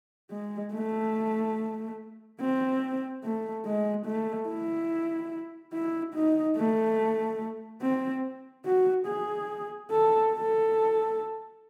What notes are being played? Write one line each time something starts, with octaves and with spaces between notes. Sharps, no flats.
G#3
A3
C4
A3
G#3
A3
E4
E4
D#4
A3
C4
F#4
G#4
A4
A4